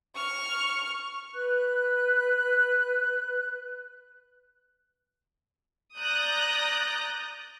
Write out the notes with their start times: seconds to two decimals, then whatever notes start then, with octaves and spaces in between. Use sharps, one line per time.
0.16 C#6 F6
1.33 B4 F#6
6.00 D5 A#5 D#6 F#6 G6 A#6